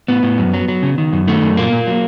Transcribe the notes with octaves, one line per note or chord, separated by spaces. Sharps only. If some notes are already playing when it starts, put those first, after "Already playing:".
A2 B3
A2
F#2
F#3
F#3
C#3
D#3
F#2
D#3 A3
F#2
A#2 A#3
A#2
F#3